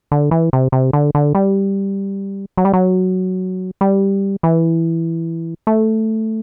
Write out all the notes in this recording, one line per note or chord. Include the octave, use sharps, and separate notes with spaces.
D3
E3
C3
C3
D3
D3
G3
F#3
G3
F#3
G3
E3
A3